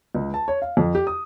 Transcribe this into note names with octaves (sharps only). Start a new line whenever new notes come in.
C#2
A5
C#5
F5
F2
G4
D#6